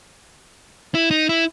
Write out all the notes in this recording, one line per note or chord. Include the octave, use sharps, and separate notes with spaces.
E4
D#4
E4